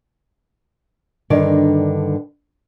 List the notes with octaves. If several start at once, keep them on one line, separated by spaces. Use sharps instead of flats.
G2 D3 D#3 A#4 D5